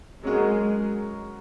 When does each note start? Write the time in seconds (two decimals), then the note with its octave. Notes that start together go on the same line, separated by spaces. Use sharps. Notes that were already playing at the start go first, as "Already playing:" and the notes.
0.23 F#3 G#3 C#4 F#4 A#4